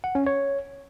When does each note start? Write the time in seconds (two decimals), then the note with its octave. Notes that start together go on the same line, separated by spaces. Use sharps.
0.04 F#5
0.15 C#4
0.27 C#5